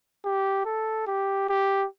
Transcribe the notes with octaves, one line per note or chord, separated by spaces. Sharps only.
G4
A4
G4
G4